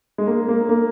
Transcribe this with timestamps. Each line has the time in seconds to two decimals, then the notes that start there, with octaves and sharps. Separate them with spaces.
0.18 G#3
0.27 A#3
0.48 A#3
0.69 A#3